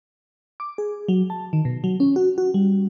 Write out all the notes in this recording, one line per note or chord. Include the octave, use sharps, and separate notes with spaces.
D6
G#4
F#3
A5
D#3
B2
F#3
C#4
F#4
F#4
G3